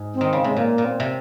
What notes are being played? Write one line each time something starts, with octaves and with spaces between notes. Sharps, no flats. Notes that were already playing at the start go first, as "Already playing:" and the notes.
Already playing: G#2
C4
D#3
C#3
C3 G#3
A#2 A#3
A#2
C4
C3